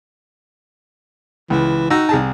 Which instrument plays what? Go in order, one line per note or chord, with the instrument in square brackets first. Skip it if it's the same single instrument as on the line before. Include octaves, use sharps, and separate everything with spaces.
[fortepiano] C#2 [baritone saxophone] E3
[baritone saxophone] D#4 [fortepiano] F#4 G5 E6
[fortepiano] C2 G#4 A5